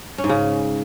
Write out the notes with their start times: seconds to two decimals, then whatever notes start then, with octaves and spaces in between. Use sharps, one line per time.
0.18 C#4
0.24 G#2
0.29 C#3